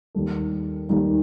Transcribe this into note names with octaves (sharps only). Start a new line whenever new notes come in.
D#2 D#3 G3 D#4 A4
D#2 D#3 G3 D#4 A4